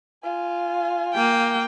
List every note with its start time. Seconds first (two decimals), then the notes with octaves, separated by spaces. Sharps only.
0.23 F4 G#5
1.14 A#3 G5